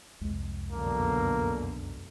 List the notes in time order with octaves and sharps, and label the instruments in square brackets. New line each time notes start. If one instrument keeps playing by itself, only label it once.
[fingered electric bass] C2 F2 G#3
[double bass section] F#2 B2 D3 [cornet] A#3